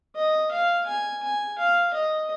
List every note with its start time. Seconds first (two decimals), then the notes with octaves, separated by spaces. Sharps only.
0.16 D#5
0.52 F5
0.86 G#5
1.23 G#5
1.59 F5
1.94 D#5